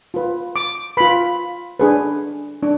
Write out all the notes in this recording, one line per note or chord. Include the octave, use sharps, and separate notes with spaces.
F4 B4
D6
F4 B4 B5
D4 G#4 B4
D4